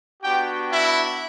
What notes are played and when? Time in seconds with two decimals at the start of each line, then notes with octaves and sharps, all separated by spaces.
0.22 B3 D4 F#4 G4 G5
0.72 E4 E5